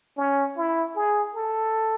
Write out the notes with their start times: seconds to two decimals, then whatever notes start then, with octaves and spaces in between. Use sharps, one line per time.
0.17 C#4
0.57 E4
0.96 G#4
1.35 A4